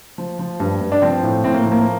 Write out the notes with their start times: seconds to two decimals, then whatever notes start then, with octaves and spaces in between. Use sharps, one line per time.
0.18 F3
0.39 F3
0.60 G2
0.81 G2
0.92 D4
1.02 F3 C4
1.23 A2
1.44 A2 C4
1.54 A#3
1.66 F3
1.72 A#3